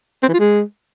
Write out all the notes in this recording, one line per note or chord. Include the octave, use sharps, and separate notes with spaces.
C4
E3
F4
G#3